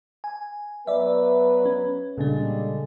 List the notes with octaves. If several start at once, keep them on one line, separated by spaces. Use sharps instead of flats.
G#5
F#3 B3 B4 D5 E5
C#4
A#2 C#3 G3 G#3 D4 A4